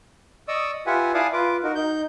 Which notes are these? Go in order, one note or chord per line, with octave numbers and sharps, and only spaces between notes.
D5 D#5 C#6 D#6 E6
F4 G4 B4 E5 F#5 G#5
E4 D5 F5 G#5 A5 D#6
F4 B4 D6
D#4 F#4 A#4
D#4 G6